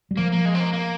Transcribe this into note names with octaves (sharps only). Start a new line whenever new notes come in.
G3
F3 A#3
A#3
G#3
C4
A#3
A#3